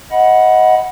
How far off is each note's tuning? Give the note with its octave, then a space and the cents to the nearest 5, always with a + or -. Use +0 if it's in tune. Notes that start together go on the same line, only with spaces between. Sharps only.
D#5 +20 F#5 +0 B5 -10